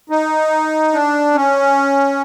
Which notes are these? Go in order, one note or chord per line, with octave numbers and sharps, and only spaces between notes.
D#4
D4
C#4